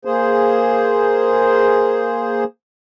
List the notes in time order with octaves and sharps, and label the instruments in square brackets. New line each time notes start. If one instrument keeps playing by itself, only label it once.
[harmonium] A#3 G#4 C5